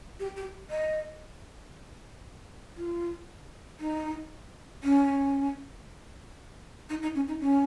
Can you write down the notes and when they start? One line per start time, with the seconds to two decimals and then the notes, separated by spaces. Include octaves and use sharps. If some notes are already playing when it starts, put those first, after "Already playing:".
0.20 G4
0.37 G4
0.70 D#5
2.77 F4
3.80 D#4
4.84 C#4
6.90 D#4
7.02 D#4
7.15 C#4
7.28 D#4
7.40 C#4